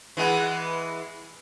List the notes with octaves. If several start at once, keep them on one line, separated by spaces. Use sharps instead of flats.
E3 G#3 B3